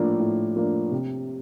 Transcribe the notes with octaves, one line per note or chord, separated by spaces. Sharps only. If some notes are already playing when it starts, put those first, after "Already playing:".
Already playing: A2 F3 A#3 D4
A2
F3 A#3 D4
C3